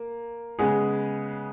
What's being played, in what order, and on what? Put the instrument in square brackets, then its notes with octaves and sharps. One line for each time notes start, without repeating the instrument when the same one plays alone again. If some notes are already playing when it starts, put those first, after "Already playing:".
Already playing: [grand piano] A#3
[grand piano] C#3 G#3 B3 [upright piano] G#4